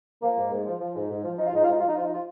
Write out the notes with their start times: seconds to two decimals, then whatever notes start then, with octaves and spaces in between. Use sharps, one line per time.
0.22 F3 A#3
0.37 G#2
0.52 G#2
0.66 F3
0.81 F3
0.95 G#2
1.10 G#2
1.24 F3
1.38 F3 D#4
1.47 F4
1.53 G#2 D#4
1.63 F4
1.68 G#2 D#4
1.79 F3 F4
1.88 D#4
1.96 F3 F4
2.04 D#4
2.13 F4